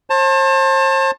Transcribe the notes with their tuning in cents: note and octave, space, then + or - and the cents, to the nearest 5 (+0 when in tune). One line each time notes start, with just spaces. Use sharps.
C5 +40 A5 +20